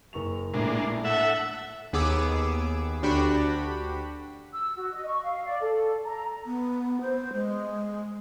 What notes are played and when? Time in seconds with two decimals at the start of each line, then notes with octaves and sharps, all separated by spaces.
0.13 F#1 C#6 F7
0.54 A#1 A2 G#3 A#3 D4
1.04 A4 E5 F#5 E6
1.93 D#2 B3 G#4 D6 E6
3.03 D2 D4 F#4 G4 B5
4.53 E6
4.76 F#4
4.93 D#5
5.06 C#6
5.23 F5
5.46 D5
5.61 A4
6.04 A#5
6.45 B3
7.01 C5
7.33 G#3